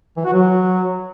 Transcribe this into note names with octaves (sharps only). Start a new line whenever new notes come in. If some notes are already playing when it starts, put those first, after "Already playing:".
E3
F#4
F#3